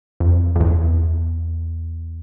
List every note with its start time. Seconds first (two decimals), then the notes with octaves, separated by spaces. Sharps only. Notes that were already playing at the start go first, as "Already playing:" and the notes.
0.20 F2
0.56 F2
0.60 E2